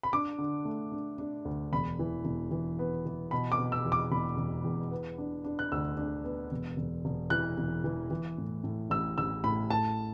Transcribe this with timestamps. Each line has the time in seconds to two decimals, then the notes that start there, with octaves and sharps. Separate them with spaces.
0.03 B5
0.13 D4 D6
0.38 D3
0.65 A3
0.92 D4
1.18 D4
1.45 D2
1.72 E1 B5
1.99 E3
2.25 E1
2.51 E3
2.79 B3
3.06 E3
3.31 B2 B5
3.52 D6
3.58 B2
3.72 E6
3.85 E2
3.92 D6
4.12 E1 B5
4.38 E1
4.64 E2
4.91 B3
5.18 D4
5.44 D4
5.59 F#6
5.72 D2 E6
5.97 D4
6.24 B3
6.52 E1
6.77 E1
7.05 E1
7.30 E3 F#6
7.58 E1
7.84 E3
8.11 E3
8.38 A2
8.64 A2
8.90 A1 E6
9.18 A1 E6
9.44 A2 B5
9.70 A2 A5